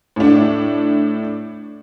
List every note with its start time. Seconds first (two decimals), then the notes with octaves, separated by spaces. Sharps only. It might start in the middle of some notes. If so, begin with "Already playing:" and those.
0.16 A2 D4